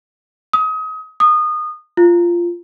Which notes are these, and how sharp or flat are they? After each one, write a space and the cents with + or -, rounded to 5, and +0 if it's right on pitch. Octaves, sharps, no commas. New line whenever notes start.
D#6 +30
D#6 -25
F4 -15